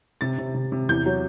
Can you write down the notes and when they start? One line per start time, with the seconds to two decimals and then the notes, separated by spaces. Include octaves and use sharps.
0.21 C3 A6
0.38 C3
0.54 C3
0.72 C3
0.89 E2 G6
1.06 F#3